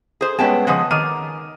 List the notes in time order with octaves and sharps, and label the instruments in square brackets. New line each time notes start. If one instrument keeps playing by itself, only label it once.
[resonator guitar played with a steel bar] G#4 C5
[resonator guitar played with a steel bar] G2 G5 A5 [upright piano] G#3 B3 C#4
[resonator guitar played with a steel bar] C#3 F3 G#3 [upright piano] F#5 D#6
[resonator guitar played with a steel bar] D#3 [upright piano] D6 F6 D#7